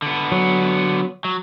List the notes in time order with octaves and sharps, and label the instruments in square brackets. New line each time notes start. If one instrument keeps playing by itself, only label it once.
[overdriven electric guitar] D3 B3
[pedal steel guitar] F#3
[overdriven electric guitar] F#3